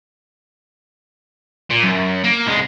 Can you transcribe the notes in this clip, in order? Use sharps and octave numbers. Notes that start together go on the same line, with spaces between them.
A#2
F#2
A#3
C2 G#3